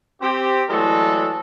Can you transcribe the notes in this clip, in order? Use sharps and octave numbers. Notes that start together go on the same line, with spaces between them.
C4 G4
E3 F#3 G#3 A3 A4 D5